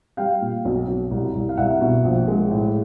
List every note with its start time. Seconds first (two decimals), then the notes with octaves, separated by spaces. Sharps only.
0.17 G3 F5 G5
0.41 A#2
0.65 B1
0.88 B1
1.11 C2
1.34 C2
1.49 F5
1.57 C2 E5 F#5
1.81 B2
2.04 A#1
2.28 G#3
2.51 A2